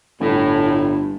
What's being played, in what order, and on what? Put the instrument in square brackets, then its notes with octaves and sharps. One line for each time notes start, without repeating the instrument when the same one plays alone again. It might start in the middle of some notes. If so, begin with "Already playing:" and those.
[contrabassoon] G1 [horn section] A2